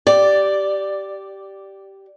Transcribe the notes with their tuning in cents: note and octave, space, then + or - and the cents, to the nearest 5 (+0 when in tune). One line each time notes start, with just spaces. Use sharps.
G4 -10 D5 +0